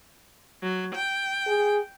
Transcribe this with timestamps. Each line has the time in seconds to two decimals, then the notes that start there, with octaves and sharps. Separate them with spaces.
0.63 F#3
0.96 G5
1.46 G#4